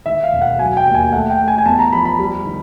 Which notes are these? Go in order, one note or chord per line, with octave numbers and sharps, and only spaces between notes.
D#3 E5
F5
E1
F#5
F#3 G#5
G5
D#2
G#5
A3 F#5
G5
A3
G#5
G#5
E2 A5
A#5
F3 B5
B5
G3
D#3